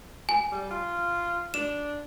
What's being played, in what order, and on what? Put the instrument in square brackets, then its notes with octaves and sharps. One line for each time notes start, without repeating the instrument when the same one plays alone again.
[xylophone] G#5
[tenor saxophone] G3
F4
[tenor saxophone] D4 [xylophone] E7